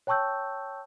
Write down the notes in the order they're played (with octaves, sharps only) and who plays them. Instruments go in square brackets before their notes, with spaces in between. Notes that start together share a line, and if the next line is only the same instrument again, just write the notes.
[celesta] C#5 G5 A5 C#6 E6 G6